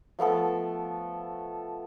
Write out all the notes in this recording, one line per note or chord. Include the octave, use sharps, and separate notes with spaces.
F3 A3 B3 A4